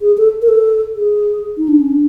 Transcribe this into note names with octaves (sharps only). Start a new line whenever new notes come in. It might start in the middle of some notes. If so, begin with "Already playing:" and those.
G#4
A4
A#4
A4
G#4
D#4
D4
C#4
D4